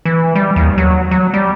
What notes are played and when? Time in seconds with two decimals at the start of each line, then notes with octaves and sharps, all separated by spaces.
0.05 E3
0.35 G3
0.56 D#2
0.78 F#3
1.11 F#3
1.34 G3